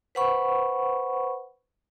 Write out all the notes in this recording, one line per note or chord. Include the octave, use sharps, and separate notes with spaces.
B4 C5 F#5 B5 C#6